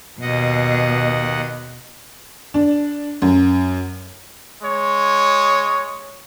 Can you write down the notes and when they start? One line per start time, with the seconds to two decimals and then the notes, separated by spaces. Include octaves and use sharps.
0.21 D#2 B2 D#5 F#5
2.54 D4
3.22 F#2
4.62 G#3 C#5